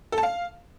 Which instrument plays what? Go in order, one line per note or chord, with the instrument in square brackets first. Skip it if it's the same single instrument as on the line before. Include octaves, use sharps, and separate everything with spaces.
[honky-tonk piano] A4
A5
F5